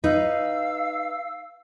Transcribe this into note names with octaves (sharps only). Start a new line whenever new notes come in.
D#4 B4 F5 E6